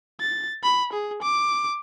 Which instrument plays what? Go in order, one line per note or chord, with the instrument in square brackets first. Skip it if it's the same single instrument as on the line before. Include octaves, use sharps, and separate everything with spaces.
[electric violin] A6
B5
G#4
D6